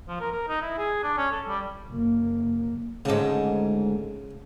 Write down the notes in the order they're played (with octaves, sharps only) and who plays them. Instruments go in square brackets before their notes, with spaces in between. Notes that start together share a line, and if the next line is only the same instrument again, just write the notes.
[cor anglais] F3
A#4
A#4
D#4
E4
G#4
D4
C#4
A4
G3
[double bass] F#1 A#3
[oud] D2 G#2 [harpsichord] C#3 A4